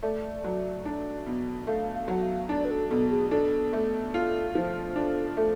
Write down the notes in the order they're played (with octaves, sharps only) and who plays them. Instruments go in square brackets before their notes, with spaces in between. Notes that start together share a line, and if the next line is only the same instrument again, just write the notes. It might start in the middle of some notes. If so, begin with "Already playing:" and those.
[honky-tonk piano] A3 [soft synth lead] D5
[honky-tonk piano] F#3
D4
B2
[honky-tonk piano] A3 [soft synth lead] F5
[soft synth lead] F5
[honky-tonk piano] F#3 [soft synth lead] F#5
[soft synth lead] F5
[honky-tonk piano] D4 [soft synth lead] D5
[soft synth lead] B4
A4
[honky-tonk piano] B2 [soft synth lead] A4
[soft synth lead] G#4
[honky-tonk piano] D4 [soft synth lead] A4
[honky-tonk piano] A3
F4
F3
[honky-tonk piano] D4 [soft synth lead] A4
[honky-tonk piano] A3 [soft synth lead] A4